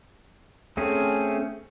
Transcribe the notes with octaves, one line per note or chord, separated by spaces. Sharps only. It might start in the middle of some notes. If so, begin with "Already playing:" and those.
A3 C4 C#4 G#4